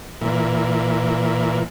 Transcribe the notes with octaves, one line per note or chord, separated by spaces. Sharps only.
A#2 E3